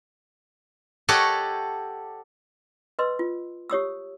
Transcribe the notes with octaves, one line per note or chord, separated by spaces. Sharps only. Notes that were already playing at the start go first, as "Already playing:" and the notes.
G4 A4 C#5 D#5 F#5
B4 D#5 C6 E6
F4
G4 C#5 D#6 E6